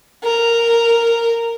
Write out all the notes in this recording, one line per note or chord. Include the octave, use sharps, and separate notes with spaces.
A#4